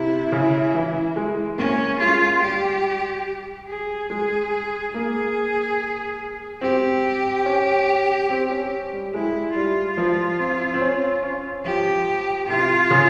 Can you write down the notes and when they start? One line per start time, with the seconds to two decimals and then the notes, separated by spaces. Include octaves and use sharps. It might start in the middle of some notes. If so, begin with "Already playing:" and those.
Already playing: C3 E4
0.32 C#3
0.74 E3
1.16 G#3
1.58 A#3 C#4
2.00 G#3 F4
2.42 G3 G4
3.68 G#4
4.10 G#3 G#4
4.94 A#3 G#4
6.61 C4 G4
7.46 C#4
8.30 C4
8.51 C#4
8.93 G3
9.13 G#3 E4
9.55 G3 F4
9.97 F3
10.39 C4
10.74 C4
10.81 C#4
11.23 C#4
11.65 F3 G4
12.49 C3 F4
12.91 C#3